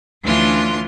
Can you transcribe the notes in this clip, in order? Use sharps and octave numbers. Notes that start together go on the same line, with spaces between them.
D2 E3 C#4 D4 F4 C6